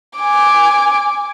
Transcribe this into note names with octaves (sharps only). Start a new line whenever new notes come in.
G#5 D6